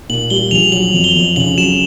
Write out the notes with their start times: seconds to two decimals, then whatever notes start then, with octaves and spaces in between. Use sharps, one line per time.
0.10 A#2 F#7
0.30 G3 G7
0.51 A#1 F7
0.72 F#3 F#7
0.93 F2
1.04 G7
1.16 F2
1.36 C#3 F#7
1.58 F#3 E7